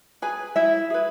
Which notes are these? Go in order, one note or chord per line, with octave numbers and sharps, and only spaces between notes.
G#4 B4 G#5
E4 E5
G#4 B4